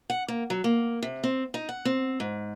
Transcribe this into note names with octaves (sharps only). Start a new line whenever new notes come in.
F#5
A#3
F#3
A#3
C3
C4
D#4
F#5
C4
G#2